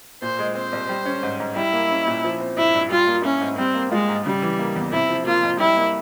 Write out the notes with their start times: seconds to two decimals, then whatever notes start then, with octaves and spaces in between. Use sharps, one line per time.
0.22 A#2 C5
0.39 G#3
0.55 C4 C5
0.72 C2
0.89 G3
1.06 C#4
1.23 G#2
1.40 G#2
1.56 G3 E4
1.73 A#3
1.90 C#4
2.07 A#2
2.24 F3
2.40 C4
2.57 G2 E4
2.75 G2
2.91 G3 F4
3.07 A#3
3.24 C#4 E4
3.41 G#2
3.58 G3 C4
3.75 A#3
3.92 G#3 F4
4.09 G#2
4.25 C#3 G3
4.42 E3
4.59 A#3
4.76 E2
4.92 C3 E4
5.09 F3
5.26 A#3 F4
5.43 F2
5.60 G3 E4
5.76 A#3